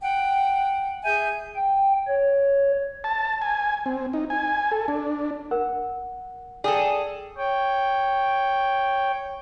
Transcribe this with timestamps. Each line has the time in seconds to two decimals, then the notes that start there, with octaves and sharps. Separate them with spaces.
0.01 F#5 G5
1.04 G#4 E5 G#5 G6
1.56 G5
2.08 C#5
3.04 A5
3.42 G#5
3.86 C4
4.13 D#4
4.30 G#5
4.72 A4
4.88 D4
5.51 A#4 F#5
6.64 G#4 A4 D5 G5 D#6
7.37 C#5 G5